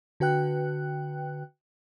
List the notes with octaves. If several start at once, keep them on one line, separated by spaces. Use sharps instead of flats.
D3 F#4 B4 G5 F#6